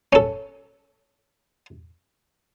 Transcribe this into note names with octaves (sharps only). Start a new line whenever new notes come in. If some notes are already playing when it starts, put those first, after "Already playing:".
C#4 A4